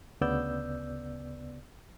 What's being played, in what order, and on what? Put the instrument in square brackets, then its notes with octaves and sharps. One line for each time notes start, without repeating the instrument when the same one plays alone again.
[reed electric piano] D2 C#3 B3 D5 E6 G6